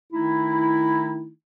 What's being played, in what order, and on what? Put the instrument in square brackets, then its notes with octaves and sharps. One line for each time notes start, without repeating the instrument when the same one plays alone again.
[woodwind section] D#3 A3 D#4 E4